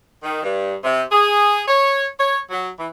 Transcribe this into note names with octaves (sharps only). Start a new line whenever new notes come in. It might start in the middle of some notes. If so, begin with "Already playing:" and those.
D#3
G2
C3
G#4
C#5
C#5
F#3
E3